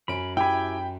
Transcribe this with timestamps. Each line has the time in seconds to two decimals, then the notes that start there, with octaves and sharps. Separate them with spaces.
0.08 F#2 C#4 B5 D7
0.37 E4 G4 G5 G#5 B5